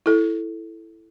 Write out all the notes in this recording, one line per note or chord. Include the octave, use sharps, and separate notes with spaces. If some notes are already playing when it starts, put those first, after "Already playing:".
E4 A4